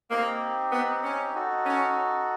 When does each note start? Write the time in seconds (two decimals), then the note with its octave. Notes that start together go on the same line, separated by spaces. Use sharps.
0.10 A#3 C4 D#4 G4
0.72 B3
1.04 C#4
1.35 D#4 F#4 A4
1.66 C#4